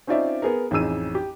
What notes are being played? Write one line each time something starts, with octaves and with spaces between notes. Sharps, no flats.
C4 C#4 D#4 F4 D5 E5
B3 G#4 A#4
A1 F2 D#4 G#4 E6 D#7
G4